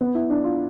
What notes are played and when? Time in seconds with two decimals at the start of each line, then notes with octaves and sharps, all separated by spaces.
0.01 B3
0.15 E4
0.30 D4
0.44 F4